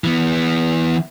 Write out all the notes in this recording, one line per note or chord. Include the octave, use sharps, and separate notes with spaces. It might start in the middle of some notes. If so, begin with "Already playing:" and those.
E3 B3